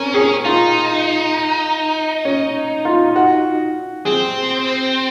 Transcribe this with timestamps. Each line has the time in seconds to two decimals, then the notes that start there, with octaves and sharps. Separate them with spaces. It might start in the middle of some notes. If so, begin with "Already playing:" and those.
Already playing: C4 C#4 A#4
0.14 G#4
0.45 D#4 F4
2.25 C#4
2.85 F4
3.16 F#4
4.05 C4 G#4